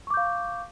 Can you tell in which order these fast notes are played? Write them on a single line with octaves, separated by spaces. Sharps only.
C#6 D6 G6 F5